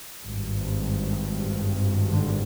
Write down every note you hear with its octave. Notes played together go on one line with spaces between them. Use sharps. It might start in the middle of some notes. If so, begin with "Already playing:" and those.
G#1 G2
D3